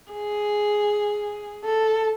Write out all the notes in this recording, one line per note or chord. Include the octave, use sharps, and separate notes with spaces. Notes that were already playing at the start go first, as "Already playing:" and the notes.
G#4
A4